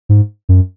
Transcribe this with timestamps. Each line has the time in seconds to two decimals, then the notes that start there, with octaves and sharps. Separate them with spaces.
0.09 G#2
0.49 F#2